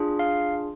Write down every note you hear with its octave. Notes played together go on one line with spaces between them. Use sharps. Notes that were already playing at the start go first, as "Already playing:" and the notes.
Already playing: D4 F4 G#4
F5